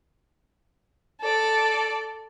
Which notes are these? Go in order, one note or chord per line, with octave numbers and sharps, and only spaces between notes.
A4 D5